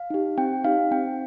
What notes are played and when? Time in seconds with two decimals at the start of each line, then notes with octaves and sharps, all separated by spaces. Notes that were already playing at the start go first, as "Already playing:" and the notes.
Already playing: F5
0.10 D#4 G4
0.38 C4 G5
0.64 D#4 G4 F5
0.91 C4 G5